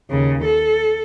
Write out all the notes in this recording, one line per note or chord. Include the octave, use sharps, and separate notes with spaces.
D#2 C#3
A4